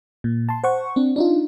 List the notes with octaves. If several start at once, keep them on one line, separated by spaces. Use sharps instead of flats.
A#2
A5 C6
C5 F#5 C#6
C4 D4
D4 D#4 F4